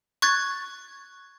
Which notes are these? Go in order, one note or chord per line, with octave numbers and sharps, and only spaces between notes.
C#6 F#6 G#6 A6